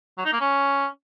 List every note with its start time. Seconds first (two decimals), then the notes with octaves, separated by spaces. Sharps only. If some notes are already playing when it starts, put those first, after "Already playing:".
0.18 F#3
0.25 D#4
0.33 A#3
0.41 C#4